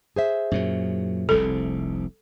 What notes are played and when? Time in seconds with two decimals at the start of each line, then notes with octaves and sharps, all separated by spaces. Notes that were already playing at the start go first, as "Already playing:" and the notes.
0.16 G#4 C5 E5
0.51 F#2 A#2 F#3
1.29 F1 C2 C3 A4